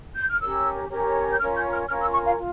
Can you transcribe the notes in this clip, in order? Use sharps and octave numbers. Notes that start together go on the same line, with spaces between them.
G6
F6
C#4 G4 A#4 C#5 E6
C#4 G4 A#4 C#5
G6
C#4 F4 A#4 C#5 F6
G6
F6
C#4 F4 A#4 C#5 F6
E6
C#6
F5
F4